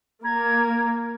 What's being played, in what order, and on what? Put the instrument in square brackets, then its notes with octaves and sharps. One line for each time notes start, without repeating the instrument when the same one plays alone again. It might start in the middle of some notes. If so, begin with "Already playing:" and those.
[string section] A#3 [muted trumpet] A#5 [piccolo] G#6